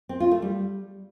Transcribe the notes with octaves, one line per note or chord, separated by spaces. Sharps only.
C4
F4
A3
G3